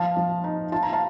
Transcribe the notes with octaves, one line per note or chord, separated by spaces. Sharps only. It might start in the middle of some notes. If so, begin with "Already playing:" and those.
Already playing: F3 F5 A5
F3
D#4
F4 A5
A#5
F5 A5